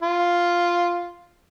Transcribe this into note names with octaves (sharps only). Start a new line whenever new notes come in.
F4